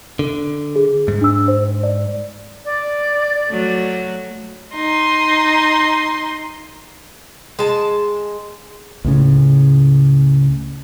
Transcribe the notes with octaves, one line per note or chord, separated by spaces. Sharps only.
D3
G#4
G#2
D4 E6
C5
D5
D5
F#3 A3
D#4 C6
G#3 A5
C#2 A2 C#3